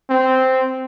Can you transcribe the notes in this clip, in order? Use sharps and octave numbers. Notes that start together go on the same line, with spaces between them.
C4